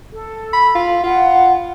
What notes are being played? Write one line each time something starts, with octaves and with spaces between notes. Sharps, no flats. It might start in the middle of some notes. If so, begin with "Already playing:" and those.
A4
B5
F4
F4 F#5